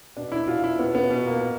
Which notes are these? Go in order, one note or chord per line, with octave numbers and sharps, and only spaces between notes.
B2 D4
E4
B2 F4
E4
B2 B3
B3
B2
A#3
B2